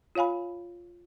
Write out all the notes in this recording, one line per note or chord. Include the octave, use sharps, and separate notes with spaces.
F4 C#5 F5 G#5 B5